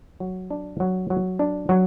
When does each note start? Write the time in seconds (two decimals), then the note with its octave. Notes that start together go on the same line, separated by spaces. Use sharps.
0.20 F#3
0.50 D4
0.80 F#3
1.10 F#3
1.39 D4
1.69 F#3